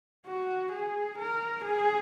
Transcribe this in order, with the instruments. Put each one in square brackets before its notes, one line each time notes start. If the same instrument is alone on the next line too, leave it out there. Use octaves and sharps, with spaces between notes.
[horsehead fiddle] F#4
G#4
A#4
G#4